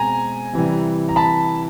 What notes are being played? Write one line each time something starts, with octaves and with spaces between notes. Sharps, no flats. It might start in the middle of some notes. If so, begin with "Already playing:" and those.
Already playing: B2 G#3 C4 G#5 A#5
C3 E3 G3
A#5
A5 B5